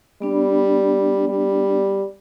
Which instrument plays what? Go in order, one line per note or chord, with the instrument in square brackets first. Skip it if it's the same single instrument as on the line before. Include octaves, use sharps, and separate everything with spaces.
[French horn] G3 [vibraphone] B3 D4
[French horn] G3